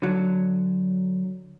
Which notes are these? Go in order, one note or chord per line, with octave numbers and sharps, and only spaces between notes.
D3 F#3